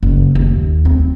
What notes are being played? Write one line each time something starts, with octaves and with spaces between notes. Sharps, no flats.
F#1
D#2
C4